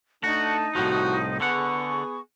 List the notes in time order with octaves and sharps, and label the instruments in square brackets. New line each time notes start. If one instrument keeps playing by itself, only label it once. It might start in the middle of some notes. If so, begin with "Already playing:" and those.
[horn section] A3 D4 A5 [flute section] D#4 [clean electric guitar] F#4
[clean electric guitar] C2 A2 F3 [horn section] F#4
[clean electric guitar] D3 F#5 [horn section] B3 G#4 [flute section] C#6